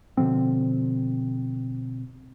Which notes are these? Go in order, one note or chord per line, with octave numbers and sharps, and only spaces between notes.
B2 D3 F3 C4